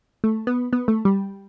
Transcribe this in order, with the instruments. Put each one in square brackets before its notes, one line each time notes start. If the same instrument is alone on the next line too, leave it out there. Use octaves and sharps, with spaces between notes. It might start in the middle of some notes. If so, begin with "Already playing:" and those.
[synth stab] A3
B3
B3
A3
G3